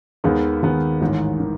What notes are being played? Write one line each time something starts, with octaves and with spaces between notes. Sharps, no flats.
D#2 D#3 G#3 B3
D#2 D#3 G#3 B3
A1 G#2 D#3
D#3